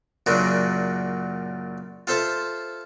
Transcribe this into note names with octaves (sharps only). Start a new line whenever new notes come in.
F#2 A#2 C#3 F#3 D4
F4 A4 C5 E5 A5